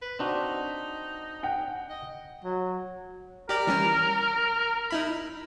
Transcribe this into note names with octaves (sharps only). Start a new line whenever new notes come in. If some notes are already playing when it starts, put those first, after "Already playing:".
B4
C4 D4 D#4 F#4
F#5 G5
D#5
F#3
G4 A#4 D5
E3 G3 C#4
D#4 E4 B5